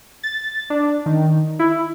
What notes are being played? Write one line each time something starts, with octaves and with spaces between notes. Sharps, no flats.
A6
D4
D#3
E4